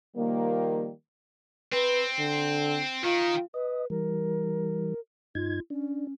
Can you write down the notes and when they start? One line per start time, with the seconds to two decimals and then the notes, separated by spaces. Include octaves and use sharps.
0.16 D#3 F3 G3 A#3
1.72 C4 B4
2.19 D3
3.04 D#3 F4
3.54 B4 D#5
3.90 E3 G3 A#4
5.35 G2 D#4 F4 G#6
5.70 C#4 D4